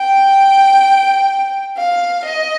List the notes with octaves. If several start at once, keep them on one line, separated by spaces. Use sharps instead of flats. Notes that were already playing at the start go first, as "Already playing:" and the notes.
Already playing: G5
F5
D#5